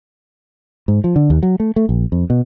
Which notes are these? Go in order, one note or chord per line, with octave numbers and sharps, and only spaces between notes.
G#2
F3
D3
D#2
F#3
A3
A3
A#1
F2
B2